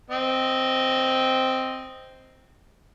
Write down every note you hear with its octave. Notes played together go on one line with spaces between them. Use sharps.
C4 D#5